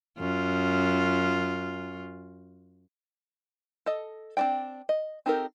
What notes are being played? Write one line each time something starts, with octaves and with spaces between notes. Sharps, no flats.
F#2 F4
A4 D#5
C4 D4 F#4 D5 G5
D#5
C4 D#4 G4 A4 A#4